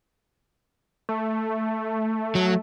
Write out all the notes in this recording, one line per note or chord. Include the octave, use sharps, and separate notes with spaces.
A3
F#3